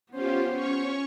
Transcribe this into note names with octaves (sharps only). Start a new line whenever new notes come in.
B3 C#4 F4 G4 C5
C#4 C#5 C#6